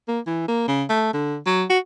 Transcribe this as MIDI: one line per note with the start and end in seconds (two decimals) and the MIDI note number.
0.08 0.19 58
0.27 0.48 52
0.48 0.66 58
0.67 0.84 49
0.89 1.13 57
1.13 1.37 50
1.46 1.63 54
1.70 1.78 66